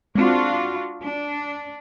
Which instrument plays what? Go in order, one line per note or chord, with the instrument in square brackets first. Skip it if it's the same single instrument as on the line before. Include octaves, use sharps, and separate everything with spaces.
[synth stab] G#3 C4 [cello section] D4 F4 F#4
[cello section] D4